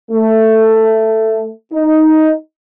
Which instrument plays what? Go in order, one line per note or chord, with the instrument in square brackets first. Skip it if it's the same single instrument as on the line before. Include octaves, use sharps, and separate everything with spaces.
[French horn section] A3
D#4